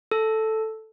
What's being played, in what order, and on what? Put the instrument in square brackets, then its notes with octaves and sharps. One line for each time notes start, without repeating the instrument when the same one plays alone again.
[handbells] A4